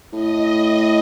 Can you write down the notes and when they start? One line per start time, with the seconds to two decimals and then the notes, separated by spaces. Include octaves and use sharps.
0.13 A2 D#5